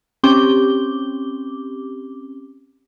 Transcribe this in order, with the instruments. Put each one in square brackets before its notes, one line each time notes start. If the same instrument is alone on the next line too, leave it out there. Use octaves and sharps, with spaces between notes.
[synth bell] C4 C#4 G4 D6 G7